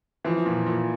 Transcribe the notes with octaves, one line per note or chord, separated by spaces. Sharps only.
E3 F3
A#2
A#2